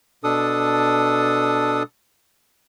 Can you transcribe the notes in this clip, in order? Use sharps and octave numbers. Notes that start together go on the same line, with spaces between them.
B2 D4 A4 D#6